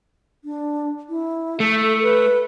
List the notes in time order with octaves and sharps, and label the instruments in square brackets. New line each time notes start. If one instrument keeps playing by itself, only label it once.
[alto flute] D4
E4
[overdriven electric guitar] A3 [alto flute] A4
[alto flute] B4